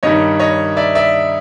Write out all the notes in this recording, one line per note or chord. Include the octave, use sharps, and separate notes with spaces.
G2 D#3 G3 C#5 D#5
C#5 D#5
D5 E5
D5 E5